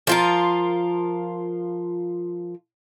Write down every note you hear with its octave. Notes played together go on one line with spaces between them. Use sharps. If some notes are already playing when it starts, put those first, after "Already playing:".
F3 F4 A#4